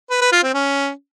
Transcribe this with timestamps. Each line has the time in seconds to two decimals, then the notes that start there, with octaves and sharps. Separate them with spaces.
0.10 B4
0.21 B4
0.32 F4
0.43 C4
0.54 C#4